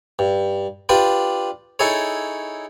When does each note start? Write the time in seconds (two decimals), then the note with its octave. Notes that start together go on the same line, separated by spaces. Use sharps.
0.19 G2
0.89 D4 F4 G4 B4 D5
1.79 D#4 E4 G#4 A4 C#5